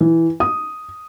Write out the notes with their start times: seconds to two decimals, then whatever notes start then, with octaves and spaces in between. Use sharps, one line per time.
0.01 E3
0.40 D#6